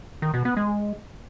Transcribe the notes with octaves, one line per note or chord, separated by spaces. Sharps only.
D#3
B2
B3
G#3